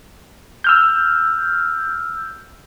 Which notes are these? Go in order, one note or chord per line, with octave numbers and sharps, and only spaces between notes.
E6 F6 G6